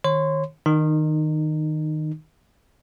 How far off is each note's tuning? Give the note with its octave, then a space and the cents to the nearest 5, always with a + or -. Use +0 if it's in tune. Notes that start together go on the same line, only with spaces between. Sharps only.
D#3 +0 C#5 -30 C6 -35
D#3 +0 D#4 -25